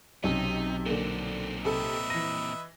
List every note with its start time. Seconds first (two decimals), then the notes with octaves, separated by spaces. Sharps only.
0.24 B1 C3 C#4 D#4
0.86 A#2 D3 A#3 C4
1.65 C3 A4 B4 D#5 E5
2.10 E3 A#6 D#7